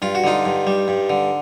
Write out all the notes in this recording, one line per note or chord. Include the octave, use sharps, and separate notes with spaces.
G2 F4
F#4
D3 D#4 F4
G2
G3
G2
D3